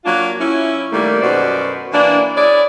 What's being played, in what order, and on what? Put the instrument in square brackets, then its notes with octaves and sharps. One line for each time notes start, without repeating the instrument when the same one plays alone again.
[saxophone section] F#3 A#3 D4 F4
C#4 E4
D#3 G3 A3 A#3
F#2 B2 C5 D5
E3 A#3 D4
E4 G#4 C#5 D5